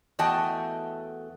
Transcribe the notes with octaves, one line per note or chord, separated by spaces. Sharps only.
E2 A3 F#4 D#5 G5 A5